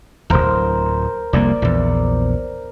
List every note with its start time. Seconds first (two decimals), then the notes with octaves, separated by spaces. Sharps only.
0.30 D1 G#1 A#4 C5
1.33 F1 C2 A#3 D5
1.62 A#1 E2